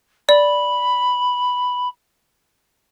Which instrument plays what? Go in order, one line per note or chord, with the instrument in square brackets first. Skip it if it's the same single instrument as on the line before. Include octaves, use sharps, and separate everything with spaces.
[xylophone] D5 [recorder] B5